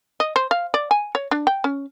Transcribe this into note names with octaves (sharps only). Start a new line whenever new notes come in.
D#5
C5
F5
D5
G#5
C#5
D4
G5
C#4